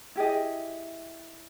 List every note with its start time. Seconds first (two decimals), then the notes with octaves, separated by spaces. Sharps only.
0.16 E4 G4 G#4 D#5